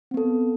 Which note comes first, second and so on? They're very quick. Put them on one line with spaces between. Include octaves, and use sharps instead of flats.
C4 B3 A4